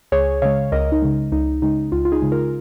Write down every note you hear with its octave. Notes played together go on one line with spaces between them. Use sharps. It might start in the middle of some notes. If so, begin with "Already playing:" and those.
C#2 G#4 C#5
C#3 G#3 C#5 F5
C#2 A#4 D#5
D#4
C#3 G#3
C#2 D#4
C#3 G#3 D#4
C#2 F4
F4
D#4 G#4
C#3 G#3
F4 A#4